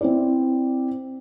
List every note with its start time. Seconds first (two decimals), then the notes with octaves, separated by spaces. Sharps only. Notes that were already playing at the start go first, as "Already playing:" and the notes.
0.01 C4 E4 D5